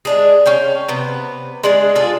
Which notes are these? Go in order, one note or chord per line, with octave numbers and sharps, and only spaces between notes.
G#3 D4 G#4
C#4 F5 G5
C3 B3
G#3 D4 G#4 D5
D4 F4 G#4 A4